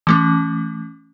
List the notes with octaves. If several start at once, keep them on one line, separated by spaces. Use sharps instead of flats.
E3 A3 C#4